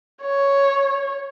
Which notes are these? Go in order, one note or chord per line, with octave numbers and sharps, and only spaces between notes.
C#5